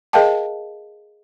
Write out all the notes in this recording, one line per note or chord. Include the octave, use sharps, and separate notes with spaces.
G#4 A#4 D#5 F5 G5 A5